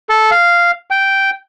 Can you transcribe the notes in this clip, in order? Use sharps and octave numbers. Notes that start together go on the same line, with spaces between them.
A4
F5
G5